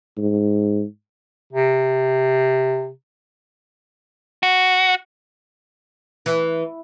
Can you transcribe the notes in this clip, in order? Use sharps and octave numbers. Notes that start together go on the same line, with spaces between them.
G#2
C3
F#4
E3